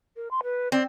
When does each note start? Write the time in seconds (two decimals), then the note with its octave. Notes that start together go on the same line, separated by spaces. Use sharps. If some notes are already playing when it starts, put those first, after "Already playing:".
0.16 A#4
0.31 C6
0.43 B4
0.72 C4 D5